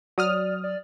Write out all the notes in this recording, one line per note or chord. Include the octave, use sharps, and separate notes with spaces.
F#3 D5 D#6 F6
D5